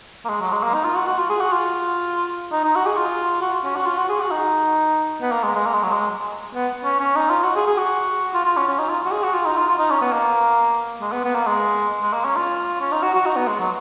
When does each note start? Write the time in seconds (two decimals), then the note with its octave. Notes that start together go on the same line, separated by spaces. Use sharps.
0.25 A#3
0.29 G#3
0.41 F#3
0.52 G#3
0.63 A#3
0.74 D#4
0.85 F4
0.96 F#4
1.07 F#4
1.18 F4
1.29 G#4
1.40 F#4
1.52 F4
2.52 D#4
2.64 D#4
2.76 F#4
2.86 G#4
2.97 F4
3.41 F#4
3.64 C#4
3.76 F#4
3.86 F4
3.98 F#4
4.09 G#4
4.21 F#4
4.31 D#4
5.21 B3
5.32 A#3
5.44 G#3
5.55 G#3
5.66 A#3
5.74 G#3
5.83 F#3
5.92 G#3
6.55 B3
6.84 C#4
7.00 C#4
7.15 D#4
7.30 F4
7.44 F#4
7.56 G#4
7.67 G#4
7.78 F#4
8.34 F4
8.45 F4
8.57 C#4
8.67 C#4
8.78 D#4
8.89 F4
9.06 F#4
9.11 G#4
9.23 F#4
9.34 F4
9.46 D#4
9.57 F4
9.68 F4
9.79 D#4
9.90 C#4
10.01 B3
10.12 A#3
11.01 G#3
11.13 B3
11.24 B3
11.35 A#3
11.47 G#3
12.02 G#3
12.13 A#3
12.24 C#4
12.36 F4
12.81 C#4
12.92 D#4
13.03 F#4
13.15 F#4
13.26 D#4
13.36 B3
13.48 G#3
13.60 F#3